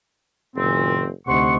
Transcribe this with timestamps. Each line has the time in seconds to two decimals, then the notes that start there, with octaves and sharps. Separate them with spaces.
0.56 F#1 A#2 D#3 C4
1.27 D2 C3 D#4 F#5 C6 C#6